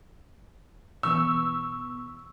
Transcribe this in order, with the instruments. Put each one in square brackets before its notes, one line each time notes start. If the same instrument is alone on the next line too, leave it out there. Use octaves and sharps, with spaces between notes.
[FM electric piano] B2 E3 B3 [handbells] C#6 [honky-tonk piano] E6